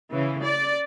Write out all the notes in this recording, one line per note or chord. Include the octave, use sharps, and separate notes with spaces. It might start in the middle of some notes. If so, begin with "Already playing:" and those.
C#3 E3
D5